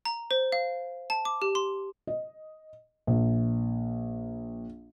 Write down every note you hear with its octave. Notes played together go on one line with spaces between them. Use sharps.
A#5
C5
F5
A5
D6
G4
C6
D#5
A#1